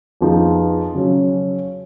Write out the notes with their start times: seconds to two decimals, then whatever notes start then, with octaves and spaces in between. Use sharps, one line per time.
0.21 F2 F3 B3 D#4 G#4
0.95 C#3 F#3 C#4